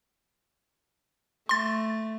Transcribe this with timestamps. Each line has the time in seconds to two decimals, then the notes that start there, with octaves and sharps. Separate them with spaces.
1.49 A3 C6 A6